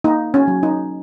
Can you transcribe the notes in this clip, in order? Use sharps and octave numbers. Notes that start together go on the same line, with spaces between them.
A#3 D#4
C#4
F#3
D#4